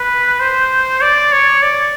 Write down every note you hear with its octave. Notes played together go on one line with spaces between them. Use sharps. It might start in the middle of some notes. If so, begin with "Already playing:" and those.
Already playing: B4
C5
D5
C#5
D5